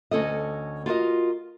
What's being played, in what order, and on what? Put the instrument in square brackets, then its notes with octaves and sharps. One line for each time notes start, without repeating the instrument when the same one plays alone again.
[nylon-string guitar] D2 C#4 A4 D#5
F4 F#4 A#4 D#5